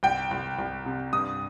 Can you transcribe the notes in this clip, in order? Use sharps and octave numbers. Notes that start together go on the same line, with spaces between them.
C2 G5
C2
C2
C3
G2 D#6